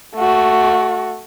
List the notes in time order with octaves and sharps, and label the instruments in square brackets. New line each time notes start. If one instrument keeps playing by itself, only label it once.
[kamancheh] A3 F#4